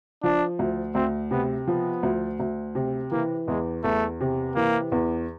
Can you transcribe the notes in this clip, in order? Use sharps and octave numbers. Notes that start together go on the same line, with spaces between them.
F3 D4
D2
D2 C4
C3 B3
F3 B3
D2
D2
C3
E3 A#3
E2 G#3
E2 A3
C3
E3 A#3
E2